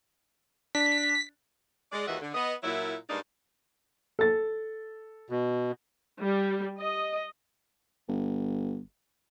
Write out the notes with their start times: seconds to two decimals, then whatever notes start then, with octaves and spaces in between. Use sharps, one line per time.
0.75 D4 B6
1.92 G#3 D5
2.08 D#2 G#2 E3 F#4 D#5 E5
2.22 D3
2.35 B3 D#5
2.63 A#2 F#3 E4
3.09 G2 G#3 A#3 D4 D#4
4.19 A4 A6
5.30 B2
6.20 G3
6.78 D#5
8.08 G1